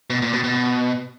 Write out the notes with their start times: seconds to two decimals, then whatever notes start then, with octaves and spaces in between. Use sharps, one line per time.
0.10 B2
0.22 A#2
0.33 B2
0.44 B2